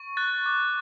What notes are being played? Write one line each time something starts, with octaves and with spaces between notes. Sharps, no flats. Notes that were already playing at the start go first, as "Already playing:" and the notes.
Already playing: C#6
F#6 A6
D6